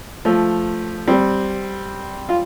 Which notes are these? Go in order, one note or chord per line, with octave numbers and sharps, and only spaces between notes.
F3 A3
G3 C4
F4